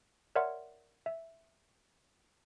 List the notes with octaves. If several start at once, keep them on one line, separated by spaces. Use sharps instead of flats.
A#4 C#5 D5 E5 F#5 C6
E5